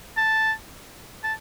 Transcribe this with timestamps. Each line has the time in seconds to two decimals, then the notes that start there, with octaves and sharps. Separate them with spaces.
0.17 A5
1.24 A5